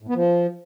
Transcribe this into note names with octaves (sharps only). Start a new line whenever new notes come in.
A2
B3
F3